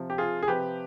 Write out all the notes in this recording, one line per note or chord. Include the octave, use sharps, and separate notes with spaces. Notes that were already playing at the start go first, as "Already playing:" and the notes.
Already playing: C3 F3
G4
F4 G#4
G#4
C3 F3 G4 B4